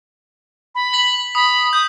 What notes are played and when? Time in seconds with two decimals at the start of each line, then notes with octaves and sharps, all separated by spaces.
0.75 B5
0.93 B6 F#7
1.35 B5 D#6
1.73 D#6 G6